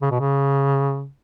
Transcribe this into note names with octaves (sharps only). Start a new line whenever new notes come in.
C#3
B2
C#3